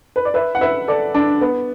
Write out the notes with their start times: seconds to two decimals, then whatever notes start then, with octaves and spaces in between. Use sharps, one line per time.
0.16 B4
0.25 D5
0.34 B4 E5
0.55 F#5
0.61 B4 E5
0.88 A4 D5
1.14 D4
1.41 B3